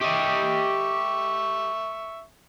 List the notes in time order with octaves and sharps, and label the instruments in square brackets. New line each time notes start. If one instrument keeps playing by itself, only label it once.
[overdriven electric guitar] G4 D#5 [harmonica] E5 C#6